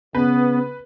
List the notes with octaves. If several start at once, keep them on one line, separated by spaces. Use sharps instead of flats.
C#3 B3 B4